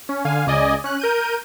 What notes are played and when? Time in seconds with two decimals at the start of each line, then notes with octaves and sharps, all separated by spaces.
0.09 C#4
0.25 D3 F5 G#5
0.46 C#2 C#3 D5 D#5 G#5
0.84 C#4 F#6
1.00 A#4 G6 D#7